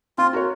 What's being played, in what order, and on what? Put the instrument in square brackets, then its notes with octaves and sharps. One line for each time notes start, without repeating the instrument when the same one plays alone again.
[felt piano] C4 [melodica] F4
[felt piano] F#4 A#4 C#5